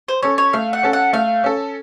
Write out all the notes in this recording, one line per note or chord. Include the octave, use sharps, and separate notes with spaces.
C5
C#4 A4 C#5
C#5
A3 F5
F#5
C#4 A4
F#5
A3 F5
C#4 A4